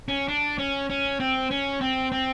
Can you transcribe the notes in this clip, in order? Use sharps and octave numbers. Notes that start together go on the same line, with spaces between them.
C#4
D4
C#4
C#4
C4
C#4
C4
C4